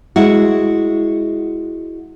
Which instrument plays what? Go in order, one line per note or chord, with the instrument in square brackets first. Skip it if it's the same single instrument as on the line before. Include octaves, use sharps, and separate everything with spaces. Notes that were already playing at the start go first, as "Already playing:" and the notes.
[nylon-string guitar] G#3 E4 F#4